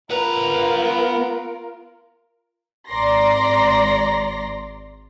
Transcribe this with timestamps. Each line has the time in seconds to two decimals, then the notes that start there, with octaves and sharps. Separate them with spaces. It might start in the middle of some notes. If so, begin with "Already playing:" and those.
0.10 B3 F4 A#4 B4 A#5
2.88 G#1 D5 A#5 C6 A#6